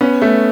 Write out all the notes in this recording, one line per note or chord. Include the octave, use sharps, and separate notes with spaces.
B3 C#4
A3 B3